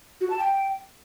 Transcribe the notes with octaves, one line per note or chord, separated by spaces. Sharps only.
F#4
A5
G5